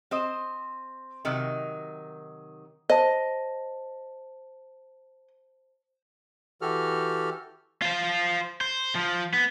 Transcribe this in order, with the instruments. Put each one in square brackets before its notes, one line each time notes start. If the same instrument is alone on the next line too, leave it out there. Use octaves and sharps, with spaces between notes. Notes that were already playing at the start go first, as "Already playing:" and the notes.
[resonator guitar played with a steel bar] C4 C5 D#5
C3 D#3 F#3 D#4
[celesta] C5 A5 [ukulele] D#5
[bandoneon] E3 F#4 G4 A4 F6
[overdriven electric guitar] F4 C5
C5
F3
B3